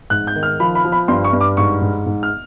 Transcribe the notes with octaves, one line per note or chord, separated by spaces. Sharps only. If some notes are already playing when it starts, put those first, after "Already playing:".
G#2 F#6
G6
D#3
F6
F3 B5
B5
F3
B5
G2 C6
C#6
G2
D6
G#2 C#6
G#2
G#2
F6